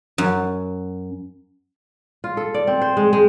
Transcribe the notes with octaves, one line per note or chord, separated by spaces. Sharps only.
F#2
F4
A4
D5
C4
C5
G#3
G#3